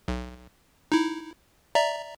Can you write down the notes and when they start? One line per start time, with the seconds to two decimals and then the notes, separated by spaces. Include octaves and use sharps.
0.08 B1
0.92 D#4 E4
1.75 D5 E5 A#5